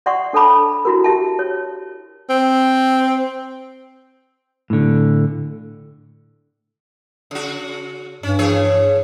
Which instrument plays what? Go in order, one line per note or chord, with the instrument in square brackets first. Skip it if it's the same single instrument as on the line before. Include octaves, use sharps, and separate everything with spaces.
[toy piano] D5 E5 F#5 C6 C#6
D4 A4 C#5 A5 B5 D6
E4 F#4 A#4
G4 E5 A5
C#5
[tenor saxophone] C4
[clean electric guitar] A2 D3
[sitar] C#3 F#4
[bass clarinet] G2 [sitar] C#4
[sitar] E3 G#4 C#5